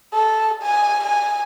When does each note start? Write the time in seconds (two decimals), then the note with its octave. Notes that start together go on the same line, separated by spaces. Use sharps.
0.14 A4
0.62 G#5
1.04 G#5